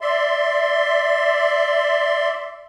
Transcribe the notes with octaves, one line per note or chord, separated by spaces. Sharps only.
D5 E5 C6